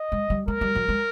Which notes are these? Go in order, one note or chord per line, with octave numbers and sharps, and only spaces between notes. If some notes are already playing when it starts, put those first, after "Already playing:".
Already playing: D#5
G#3
G3
G#3 A#4
G3
F#3
G#3